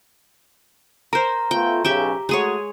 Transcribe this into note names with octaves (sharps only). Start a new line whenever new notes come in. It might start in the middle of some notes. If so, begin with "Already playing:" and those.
A#4 C5 A#5
A3 B3 F4 G5
B1 C#3 G4 E5 G5
G#3 A3 F#4 G#4 C#5